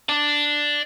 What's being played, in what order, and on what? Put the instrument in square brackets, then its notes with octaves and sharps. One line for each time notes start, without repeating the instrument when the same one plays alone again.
[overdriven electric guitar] D5 A5